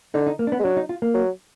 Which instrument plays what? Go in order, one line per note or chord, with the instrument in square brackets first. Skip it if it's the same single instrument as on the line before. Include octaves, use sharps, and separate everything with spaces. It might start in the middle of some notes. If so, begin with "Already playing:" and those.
[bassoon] D3 [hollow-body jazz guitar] D#4
[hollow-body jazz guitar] D#4
A#3
D4
B3
[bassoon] G#3
[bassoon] F#3 [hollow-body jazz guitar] D4
[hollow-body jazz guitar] D#4
F4
A#3
[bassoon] F#3